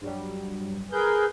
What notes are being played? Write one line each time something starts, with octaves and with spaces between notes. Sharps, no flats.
G2 F#3 G3
G#4 A#4 B4 G6